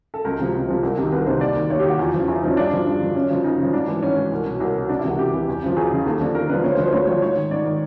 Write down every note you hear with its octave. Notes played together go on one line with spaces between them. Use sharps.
A4
C#2 A#4
C3 F3
C#2
C3 F3
C2
C3 D#3
C2 B4
C3 D#3 C5
D#2 D5
D#3
D#2 C#5
G4
D#3 F#4
E2 F4
C#3 F3
E2 E4
C#3 F3 D#4
C#4
G2 D4
D3 F3
G2
D3 F3
F#2 C#4
C#3 F3
F#2 D#4
C#3 F3
G#2 D4
E3
G#2 C#4
E3
C2
B2
C2
B2
C#2 D4
E4
C3 E3 F#4
C#2 G4
C3 E3
E2
C#3 F3
E2 G#4
C#3 F3
D#2 A4
D3 F3
D#2 A#4
D3 F3 B4
D2 C#5
C5
D3 F3 B4
C5
D2 C#5
D3 F3 C#5
G#2 C#5
D#3
G#2 D5
D#3